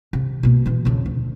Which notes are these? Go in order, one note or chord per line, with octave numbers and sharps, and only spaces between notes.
C3
B2 A#3
B2 E3
F2 C#3
D2